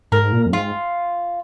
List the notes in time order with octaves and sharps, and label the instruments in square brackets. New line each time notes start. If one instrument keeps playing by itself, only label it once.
[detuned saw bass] G#2 [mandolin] A#4
[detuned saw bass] A#2
F2
[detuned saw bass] G#2 [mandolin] F4